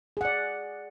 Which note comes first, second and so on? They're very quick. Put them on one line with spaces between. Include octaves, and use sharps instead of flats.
G#4 F#5 D5